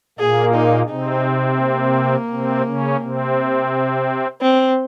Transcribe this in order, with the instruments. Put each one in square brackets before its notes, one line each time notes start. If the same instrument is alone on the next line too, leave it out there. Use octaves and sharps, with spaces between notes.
[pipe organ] A#2 A#3 [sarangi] G#4
[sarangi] D#4
[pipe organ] C3 C4 [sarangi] D#4
[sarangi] A#3
[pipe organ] C3 C4
C#3 C#4
C3 C4
[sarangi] C4